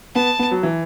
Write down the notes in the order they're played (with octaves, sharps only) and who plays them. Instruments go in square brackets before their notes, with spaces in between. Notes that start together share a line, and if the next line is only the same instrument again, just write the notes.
[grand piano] B3 [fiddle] A5
[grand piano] B3
F#3
E3